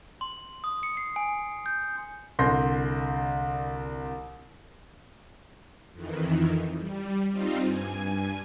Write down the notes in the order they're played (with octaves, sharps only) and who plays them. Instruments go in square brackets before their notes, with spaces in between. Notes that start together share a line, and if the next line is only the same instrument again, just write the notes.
[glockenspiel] C6
D#6
C#7
C7
G#5
G6
[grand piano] C2 D3 C6 G6 A#6
[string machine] F2 D#3 E3
G3
G3 C4 D#4 F4
G2 G#5